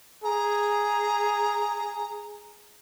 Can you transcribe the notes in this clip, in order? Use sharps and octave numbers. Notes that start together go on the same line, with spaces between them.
G#4 A#5